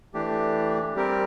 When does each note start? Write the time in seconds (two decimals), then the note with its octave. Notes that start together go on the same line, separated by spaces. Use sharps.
0.14 E3 A3 D4 G4
0.95 G3 C4 G4 A#4